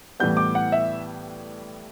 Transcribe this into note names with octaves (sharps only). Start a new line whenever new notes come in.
A2 E3 G3 B3 G6
D6
F#5
E5